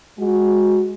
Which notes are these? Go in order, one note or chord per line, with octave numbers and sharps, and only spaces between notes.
G#3 F#4